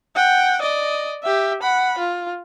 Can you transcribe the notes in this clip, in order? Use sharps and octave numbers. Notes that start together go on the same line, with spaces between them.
F#5 G5
D5 D#5
G4 E5
F#5 B5
F4